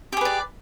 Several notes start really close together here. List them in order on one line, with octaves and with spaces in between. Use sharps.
G4 G#4 B4 D5